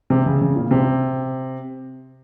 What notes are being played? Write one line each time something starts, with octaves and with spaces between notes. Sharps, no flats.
C3
C#3
C#3
A#2
C3